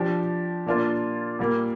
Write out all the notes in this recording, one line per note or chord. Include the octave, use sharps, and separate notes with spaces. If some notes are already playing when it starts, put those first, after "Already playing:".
Already playing: F3 D4 G4
A#2 A#3 D4 F4
A#2 G3 A#3